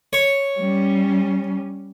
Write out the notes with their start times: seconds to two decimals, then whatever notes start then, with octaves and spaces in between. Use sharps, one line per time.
0.13 C#5
0.59 G3 C#4